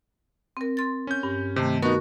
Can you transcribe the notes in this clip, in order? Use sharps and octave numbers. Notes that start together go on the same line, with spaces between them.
C4 A#4
C6 A6
C#4 G6
G2
C3 D#3 A3
B3 D#4 F#4 A#4 C#6